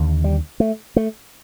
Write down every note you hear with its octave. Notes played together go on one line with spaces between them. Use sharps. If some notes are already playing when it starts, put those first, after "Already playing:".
Already playing: D#2 D3
G3
A3
A3